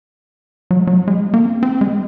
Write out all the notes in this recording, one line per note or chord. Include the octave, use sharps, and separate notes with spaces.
F#3
G#3
F#3
G#3
A#3
C4
C4
G#3